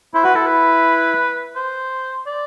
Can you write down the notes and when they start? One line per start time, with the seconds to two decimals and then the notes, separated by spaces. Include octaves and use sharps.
0.14 E4 C5
0.24 F#4 B4
0.34 E4 A4
0.46 B4
1.56 C5
2.27 D5